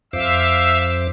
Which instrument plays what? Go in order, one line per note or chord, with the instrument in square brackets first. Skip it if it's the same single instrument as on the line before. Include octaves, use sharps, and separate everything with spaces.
[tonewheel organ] F2 C5 D6 [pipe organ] E5 F5 E6